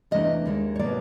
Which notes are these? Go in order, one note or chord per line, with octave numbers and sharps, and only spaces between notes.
E2 C3 E3 A3 D4 D#5
D#2 D#3 G#3
C#5
B2 F#3 A#3 D5